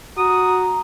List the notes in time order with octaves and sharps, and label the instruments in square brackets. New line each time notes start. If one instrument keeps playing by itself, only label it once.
[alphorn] F#4 [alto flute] A#5 [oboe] D#6